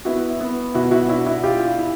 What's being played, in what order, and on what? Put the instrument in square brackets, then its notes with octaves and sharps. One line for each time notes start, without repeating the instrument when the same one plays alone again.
[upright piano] B3 E4 F#4
B3
B2 E4 F#4
E4 F#4
D4 E4 F#4
E4 F#4
E4 F4 G4
E4